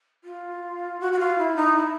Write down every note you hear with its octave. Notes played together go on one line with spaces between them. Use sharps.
F4
F#4
F#4
F4
E4
D#4
E4